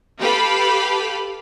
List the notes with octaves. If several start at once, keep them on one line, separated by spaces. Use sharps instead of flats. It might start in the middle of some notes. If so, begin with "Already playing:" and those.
G4 A4 B4 F5 B5